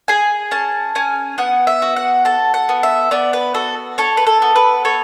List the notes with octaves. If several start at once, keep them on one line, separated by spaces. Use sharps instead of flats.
G#4 G#5
C#4 A5
C#4 G#5
B3 F#5
E5
F#4
F#5
A4 A5
F#5
B3
E5
B3 D5
B4
F#4 A4
A4 C#5
B4
A4
B3
B4
A4 C#5